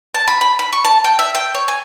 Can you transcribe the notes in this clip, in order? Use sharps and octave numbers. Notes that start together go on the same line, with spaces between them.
A5
B5
B5
B5
C#6
A5
G5
E5
G5
C#5
G#5